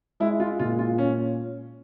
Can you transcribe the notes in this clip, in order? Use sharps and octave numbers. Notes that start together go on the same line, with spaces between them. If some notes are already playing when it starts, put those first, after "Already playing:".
G#3 E4
F4
A#2 F4
F4
C#4